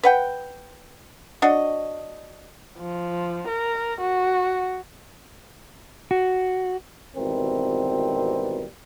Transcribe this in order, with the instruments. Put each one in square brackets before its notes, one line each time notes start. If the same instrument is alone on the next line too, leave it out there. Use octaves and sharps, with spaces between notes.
[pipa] B4 F#5 G5
D4 F#4 C#5 D#5
[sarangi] F3
A#4
F#4
[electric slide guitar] F#4
[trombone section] G#1 B2 E3 G3 C4 A#4